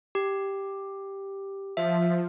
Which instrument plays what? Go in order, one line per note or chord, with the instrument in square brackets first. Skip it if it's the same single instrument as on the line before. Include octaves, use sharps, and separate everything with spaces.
[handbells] G4
[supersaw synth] F3 [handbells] E5